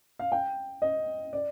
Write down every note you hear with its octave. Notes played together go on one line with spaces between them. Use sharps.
F5
G5
D#5
D5